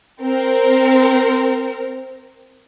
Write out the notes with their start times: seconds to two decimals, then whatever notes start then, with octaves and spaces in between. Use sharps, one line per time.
0.22 C4 A#4